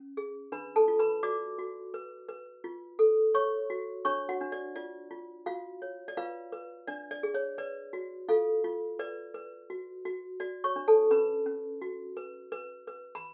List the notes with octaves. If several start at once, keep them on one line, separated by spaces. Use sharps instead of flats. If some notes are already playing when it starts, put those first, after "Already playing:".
Already playing: C#4
G#4
D4 B4 B5
A4 A5
F4
B4 B5
F#4 D5 D6
F#4
B4
B4
F4
A4
C#5 C#6
F#4
D4 C#5 C#6
F#4 F#5
D4
D5
F4 D5
F4
F4 F#4 F5
C#5
D5
F4 B4 F5
B4
D4 D5
D5
G#4
C#5
B4 D5
F#4
F4 A4 F5
F4
B4 D5
B4
F#4
F#4
F#4 D5
C#5 C#6
D4
A4 A5
C#4 B4 B5
C#4
F#4
B4
B4
B4
B5